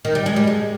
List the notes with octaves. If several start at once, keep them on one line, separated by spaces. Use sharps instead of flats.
D#3
G3
G#3
G3
G#3